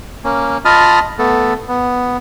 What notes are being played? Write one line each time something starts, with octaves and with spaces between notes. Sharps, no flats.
A#3 C#4
F4 D#5 A5 B5 D#6 F6
A3 B3 A4
B3